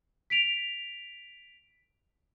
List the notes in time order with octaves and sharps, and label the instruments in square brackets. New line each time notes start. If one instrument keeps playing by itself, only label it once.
[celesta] B6 D7 F7